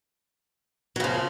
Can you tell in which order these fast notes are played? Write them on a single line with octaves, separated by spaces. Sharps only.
F#3 C#3 F3